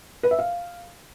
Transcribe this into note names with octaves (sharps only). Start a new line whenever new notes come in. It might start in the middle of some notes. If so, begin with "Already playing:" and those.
B4
E5
F5